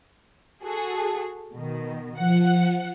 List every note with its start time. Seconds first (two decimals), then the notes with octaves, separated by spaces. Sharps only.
0.64 F#4 G#4 A4
1.53 B2 D#3
2.18 F3 F#5